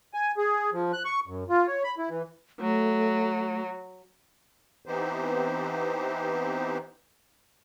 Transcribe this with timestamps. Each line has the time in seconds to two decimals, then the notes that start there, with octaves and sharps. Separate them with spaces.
0.14 G#5
0.37 G#4
0.73 F3
0.93 F#6
1.05 C#6
1.27 F#2
1.49 F4
1.67 C#5
1.84 B5
1.98 E4
2.10 E3
2.60 F#3 A3
4.86 E3 B3 C4 D#4 G4 C5